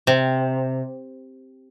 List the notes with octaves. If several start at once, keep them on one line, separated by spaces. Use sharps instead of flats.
C3